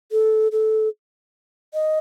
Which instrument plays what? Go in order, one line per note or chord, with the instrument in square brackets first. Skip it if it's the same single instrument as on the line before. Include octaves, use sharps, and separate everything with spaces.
[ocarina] A4
A4
D#5